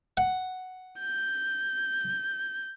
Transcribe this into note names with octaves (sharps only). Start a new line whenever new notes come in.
F#5
G6